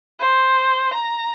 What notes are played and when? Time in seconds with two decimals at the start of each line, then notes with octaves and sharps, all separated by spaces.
0.20 C5
0.94 A#5